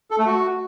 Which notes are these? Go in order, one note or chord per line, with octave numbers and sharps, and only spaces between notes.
A4
A3
F#4